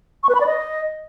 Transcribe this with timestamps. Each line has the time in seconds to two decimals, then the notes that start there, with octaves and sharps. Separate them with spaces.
0.23 C#6
0.29 B4
0.35 B5
0.40 D5
0.46 D#5